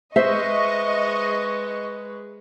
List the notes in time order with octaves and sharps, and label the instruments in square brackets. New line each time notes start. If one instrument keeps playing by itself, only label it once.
[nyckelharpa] G#3 B4 [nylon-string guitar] C5 E5 [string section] D#5 C#6